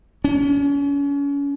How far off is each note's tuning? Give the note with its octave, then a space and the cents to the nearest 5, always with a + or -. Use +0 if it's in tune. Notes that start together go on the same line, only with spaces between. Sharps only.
C#4 +35